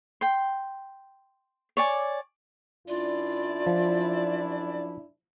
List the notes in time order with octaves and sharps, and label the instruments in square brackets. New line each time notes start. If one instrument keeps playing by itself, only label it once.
[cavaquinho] G5 C6
C#5 D5 G#5
[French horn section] F#2 D4 E4 [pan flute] F4 [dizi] D5
[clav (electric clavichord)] F3